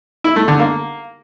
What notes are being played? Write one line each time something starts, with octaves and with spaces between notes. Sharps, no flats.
E4
A3
D3
A#3